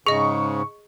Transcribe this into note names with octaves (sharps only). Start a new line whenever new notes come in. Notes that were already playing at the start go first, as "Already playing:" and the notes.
G#2 C#3 G#4 D#5 C#6